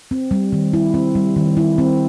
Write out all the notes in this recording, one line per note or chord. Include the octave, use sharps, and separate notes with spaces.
C4
G3
D#3
E4
C4
G3
D#3
E4
C4